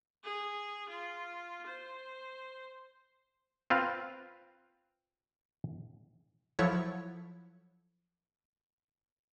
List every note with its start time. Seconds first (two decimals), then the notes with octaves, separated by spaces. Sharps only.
0.23 G#4
0.89 F4
1.66 C5
3.70 C4 F4 B4 F5
6.59 F3 F#3 E4 A4 C#5